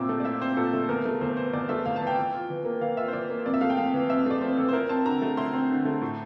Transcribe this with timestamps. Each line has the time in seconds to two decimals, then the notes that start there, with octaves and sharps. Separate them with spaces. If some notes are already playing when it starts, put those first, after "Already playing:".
Already playing: A#2 C4 E4 D6 E6
0.09 A3
0.20 D5
0.24 E4 E5
0.41 C4 C5
0.57 A#2 A4
0.73 A3
0.89 E2 A#4
1.05 A3
1.21 E2 C5
1.37 E3 C5
1.53 E2 D5
1.69 A3 E5
1.85 E2 F5
1.96 A5
2.01 E3
2.07 G5
2.18 E3
2.34 F4
2.50 E3
2.65 A#3
2.81 E3 F5
2.97 F4 E5
3.08 C5
3.13 E3 D5
3.30 A#3
3.45 F2 D5
3.54 E5
3.61 A3 F5
3.70 G5
3.77 F2 F5
3.94 E3
4.09 F2 E5
4.26 A3 D5
4.41 F2 C5
4.57 E3 A4
4.68 C5
4.73 E4 A#4
4.89 C4 A5
5.05 D3 A#5
5.22 A3
5.37 E4 C6
5.53 C4
5.70 D3
5.85 A3
6.02 A2